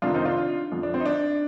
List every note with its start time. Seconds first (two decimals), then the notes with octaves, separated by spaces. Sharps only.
0.02 F2 C3 D#3 D4 F4
0.14 C4 D#4
0.25 D4 F4
0.72 F2 D3 F3
0.83 D4
0.94 C4
1.00 D#4
1.05 D4